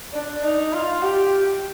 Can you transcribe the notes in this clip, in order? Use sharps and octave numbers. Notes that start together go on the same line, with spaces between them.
D4
D#4
F4
G4